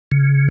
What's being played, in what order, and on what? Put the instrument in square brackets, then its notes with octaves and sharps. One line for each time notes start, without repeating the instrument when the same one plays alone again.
[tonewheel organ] C#3